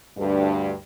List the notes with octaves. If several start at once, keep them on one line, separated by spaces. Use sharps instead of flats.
D2 G2